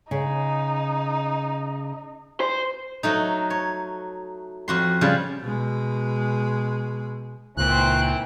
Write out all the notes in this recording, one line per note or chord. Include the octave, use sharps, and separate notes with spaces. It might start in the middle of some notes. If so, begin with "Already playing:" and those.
C#3 D#4
C5
F#3 A3 D#4
C#5
F2 F#4 C6
C#3 G3 F4
B2 G#3
C#2 A#2 D#3 E3 C4 F#6